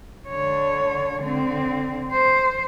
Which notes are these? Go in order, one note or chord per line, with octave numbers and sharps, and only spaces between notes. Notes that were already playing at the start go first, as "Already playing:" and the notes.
D3 C#5
D3 C4
C5